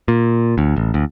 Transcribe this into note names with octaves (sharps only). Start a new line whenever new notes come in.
A#2
D2
A1
D2